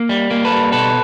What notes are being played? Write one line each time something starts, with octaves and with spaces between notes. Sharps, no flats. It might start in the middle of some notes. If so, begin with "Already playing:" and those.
Already playing: A#3
G3
A#3
A4 B4
G3
B2 A4 B4